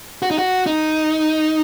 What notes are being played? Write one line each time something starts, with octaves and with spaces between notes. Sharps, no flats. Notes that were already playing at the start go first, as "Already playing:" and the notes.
F#4
D#4
F#4
D#4